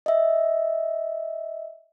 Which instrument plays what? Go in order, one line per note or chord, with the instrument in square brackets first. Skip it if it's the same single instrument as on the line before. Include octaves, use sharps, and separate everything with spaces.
[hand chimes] D#5 E5